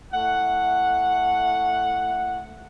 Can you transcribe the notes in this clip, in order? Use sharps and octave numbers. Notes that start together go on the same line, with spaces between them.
A3 E4 F#5